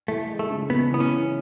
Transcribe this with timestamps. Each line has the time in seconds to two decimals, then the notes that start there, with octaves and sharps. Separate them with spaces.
0.08 E3 A3
0.29 G#3
0.39 A3
0.50 C#3
0.70 C#3 B3
0.90 E3 B3
1.00 C#4
1.10 E3